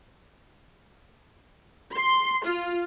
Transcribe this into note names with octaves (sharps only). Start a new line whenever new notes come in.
C6
F4